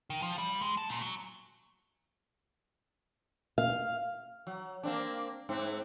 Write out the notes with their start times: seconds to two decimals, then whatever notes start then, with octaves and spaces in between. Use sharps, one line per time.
0.10 D#3
0.22 F3
0.38 G3
0.62 G#3
0.78 A5
0.89 A#2
1.02 F#3
3.58 F5
4.47 F#3
4.83 A#3 C4 D4
5.49 G#2 C4